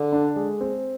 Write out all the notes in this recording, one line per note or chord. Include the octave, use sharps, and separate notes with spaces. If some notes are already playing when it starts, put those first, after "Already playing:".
Already playing: D3
D4
G#3
C4